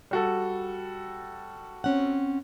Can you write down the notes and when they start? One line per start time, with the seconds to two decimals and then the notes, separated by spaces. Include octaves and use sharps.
0.11 G3 F#4 A4
1.84 C4 C#4 F#5